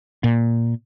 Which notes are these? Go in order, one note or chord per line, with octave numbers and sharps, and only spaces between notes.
A#2